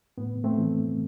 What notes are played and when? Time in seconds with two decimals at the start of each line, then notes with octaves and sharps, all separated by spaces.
0.18 A2 B3
0.44 A3 C4
0.58 E3